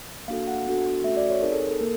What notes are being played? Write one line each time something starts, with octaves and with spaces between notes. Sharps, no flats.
A#3 D4 F#4 A4 F5
F#5
B3 D4 F#4 A4
A3 C#4 F#4 A4 E5
D5
C#5
C4 D#4 G#4 A#4
A4
A4
A#3 A#4